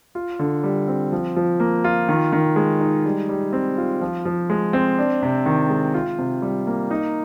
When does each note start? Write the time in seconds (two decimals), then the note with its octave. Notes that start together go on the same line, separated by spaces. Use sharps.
0.15 F4
0.39 D3
0.63 G3
0.88 C4
1.12 F3
1.36 F3
1.60 A#3
1.84 F4
2.09 D#3
2.33 D#3
2.56 G#3
2.81 D#4
3.05 G3
3.29 G3
3.53 C4
3.78 F4
4.01 F3
4.25 F3
4.50 G#3
4.73 C4
4.98 D4
5.22 C3
5.46 D#3
5.69 G#3
5.94 F4
6.18 C3
6.42 G3
6.67 A#3
6.91 D#4